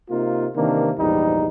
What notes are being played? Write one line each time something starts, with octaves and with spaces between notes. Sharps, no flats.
C3 A#3 D#4 F4
C3 D#3 E3 A#3 D4
A#1 E2 G#2 G3 D#4